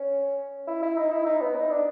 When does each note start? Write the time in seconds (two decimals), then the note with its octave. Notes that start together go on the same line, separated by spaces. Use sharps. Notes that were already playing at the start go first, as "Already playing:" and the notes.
Already playing: C#4
0.67 E4
0.82 E4
0.97 D#4
1.12 E4
1.26 D#4
1.41 B3
1.55 D#4
1.71 D4